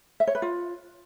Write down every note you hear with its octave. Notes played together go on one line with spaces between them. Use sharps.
E5
C#5
B4
F4